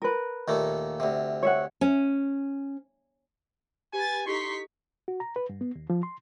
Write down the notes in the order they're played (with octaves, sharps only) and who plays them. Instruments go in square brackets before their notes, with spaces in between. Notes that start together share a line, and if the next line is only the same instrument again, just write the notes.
[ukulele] A#4 B4
[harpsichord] D#2 A#2 A3
D2 C3
[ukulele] C#5 E5 F#5
[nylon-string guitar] C#4
[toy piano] G4 [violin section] B4 A6 [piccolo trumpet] G#5
[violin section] D#4 C#6 B6 [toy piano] E4 G4 A4 [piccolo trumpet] C6
[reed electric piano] F#4
A#5
B4
G2
B3
D#2
F3
C6